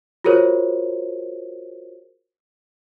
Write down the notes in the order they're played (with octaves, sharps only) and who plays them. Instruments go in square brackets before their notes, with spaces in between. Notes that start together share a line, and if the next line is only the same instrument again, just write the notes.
[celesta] F4 F#4 G#4 A#4 C5 C#5